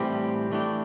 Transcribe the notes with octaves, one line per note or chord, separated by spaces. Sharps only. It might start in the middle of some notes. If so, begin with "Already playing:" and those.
Already playing: A2 E3 G3 C4 G4
E3 A3 D4 G4